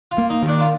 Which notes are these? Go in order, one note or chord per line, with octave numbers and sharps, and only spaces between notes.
F4
A#3
D#4
D#3
D4
F4